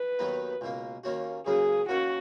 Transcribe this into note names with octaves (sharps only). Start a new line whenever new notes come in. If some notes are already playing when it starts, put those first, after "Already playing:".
Already playing: B4
D#2 D#3 F#3 B3 D#4
C#2 B2 A#3
D#2 D#3 A#3 C#4 F#4
C#2 C#3 F#3 A#3 G#4
D#3 A#3 C#4 F#4